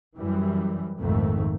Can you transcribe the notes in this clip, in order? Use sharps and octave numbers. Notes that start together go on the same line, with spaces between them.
F#2 E3 G3
A#1 F2 G#2 D#3 A3